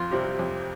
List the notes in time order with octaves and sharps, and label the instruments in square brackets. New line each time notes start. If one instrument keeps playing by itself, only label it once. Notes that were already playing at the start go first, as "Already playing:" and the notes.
Already playing: [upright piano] F2 [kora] F4
[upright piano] C3 G3 C4 G4
F2